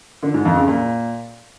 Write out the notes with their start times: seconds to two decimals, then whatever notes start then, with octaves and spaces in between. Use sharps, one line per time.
0.23 D3
0.34 G#2
0.45 F2
0.56 C#3
0.68 A#2